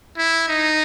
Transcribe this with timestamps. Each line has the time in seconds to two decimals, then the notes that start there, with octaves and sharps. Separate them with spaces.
0.17 E4
0.48 D#4